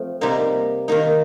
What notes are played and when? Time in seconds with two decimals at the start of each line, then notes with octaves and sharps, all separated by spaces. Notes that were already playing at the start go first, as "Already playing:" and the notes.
Already playing: F3 A3 C4
0.21 C3 G3 A#3 D#4
0.88 D#3 A#3 D#4